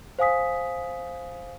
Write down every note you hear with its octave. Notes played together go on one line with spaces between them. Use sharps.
C5 F5 G#5 D#6 B6